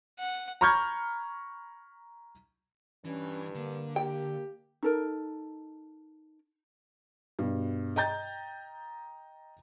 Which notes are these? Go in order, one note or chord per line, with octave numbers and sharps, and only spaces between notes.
F#5
A#5 B5 C#6 F6 G6 G#6
G2 E3 C#4
D3 A#3
G4 G5
D#4 A4 A#4
G2 B2
D#5 G5 A#5 G6 A6